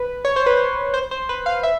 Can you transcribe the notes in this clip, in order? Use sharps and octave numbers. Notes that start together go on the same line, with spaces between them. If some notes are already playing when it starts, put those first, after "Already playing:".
Already playing: B4
C#5
C5
B4
C5
C5
C5
B4
F5
E5